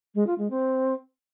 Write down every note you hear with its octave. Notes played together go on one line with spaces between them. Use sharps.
G#3
F4
G#3
C4